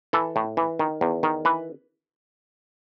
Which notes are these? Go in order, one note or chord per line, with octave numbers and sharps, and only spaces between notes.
E3 A4
A2
E3
D#3
E2
D#3
E3 B4